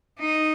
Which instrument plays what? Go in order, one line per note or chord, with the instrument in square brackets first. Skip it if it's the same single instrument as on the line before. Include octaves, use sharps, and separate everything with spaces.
[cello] D#4